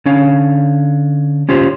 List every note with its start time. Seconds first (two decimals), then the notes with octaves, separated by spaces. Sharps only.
0.06 D3 C#4 F5
1.49 C#4 F4 G4 C5